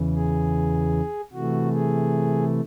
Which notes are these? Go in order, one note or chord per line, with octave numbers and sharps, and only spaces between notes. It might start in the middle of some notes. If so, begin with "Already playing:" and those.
Already playing: E2 C#3 E3
G#4
C3 E3 A3 F#4
G#4